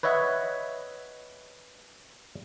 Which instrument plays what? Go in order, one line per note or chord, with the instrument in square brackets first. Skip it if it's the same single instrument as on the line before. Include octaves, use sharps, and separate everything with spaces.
[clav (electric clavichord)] B4 C#5 D#5 E5 F#5